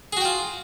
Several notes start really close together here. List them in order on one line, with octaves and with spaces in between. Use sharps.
G#4 F#4 G5 F4